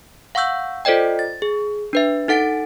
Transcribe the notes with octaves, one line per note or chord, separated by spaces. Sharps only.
F5 F#5 C#6 E6 G6
F4 A4 C5 D5 D#5 G5
A6
G#4
D4 B4 E5
D#4 A4 F#5 A6 D7